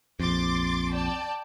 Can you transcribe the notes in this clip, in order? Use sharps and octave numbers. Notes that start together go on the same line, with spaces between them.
A#1 F2 C6 D6 A6
D5 G5 A5